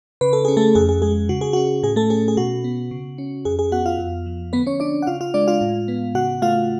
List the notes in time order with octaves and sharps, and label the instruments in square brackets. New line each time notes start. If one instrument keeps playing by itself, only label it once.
[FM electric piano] C#3 B4
A4
C#4 G#4
A3 A4
F2 G#4
G#4
G#3 G#4
C#3 F#4
G#4
C#4 F#4
A2 G#4
A3 A4
C#4 G#4
G#4
B2 F#4
B3
C#3
C#4
F2 G#4
G#4
B3 F#4 F#5
F4 F5
F2
F3
D3 B3 B4
C#4 C#5
C#4 D4 D5
F#5
C#3 F4 F5
F4 F5
G#3 D4 D5
F4 F5
A2
B3
C#3 F#4 F#5
A3 F4 F5